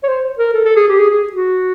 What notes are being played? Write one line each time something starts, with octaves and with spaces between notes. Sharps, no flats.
C#5
C5
A#4
A4
A4
G#4
G4
G#4
G#4
F#4